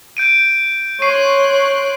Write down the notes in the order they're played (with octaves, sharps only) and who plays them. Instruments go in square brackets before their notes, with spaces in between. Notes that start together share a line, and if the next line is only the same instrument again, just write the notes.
[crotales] G6 D7 D#7
[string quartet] C#5 C6 F#6 [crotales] C#6 C7 D#7